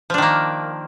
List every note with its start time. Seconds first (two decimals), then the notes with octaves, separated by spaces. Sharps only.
0.10 F3
0.14 D4
0.18 D#3
0.22 A#3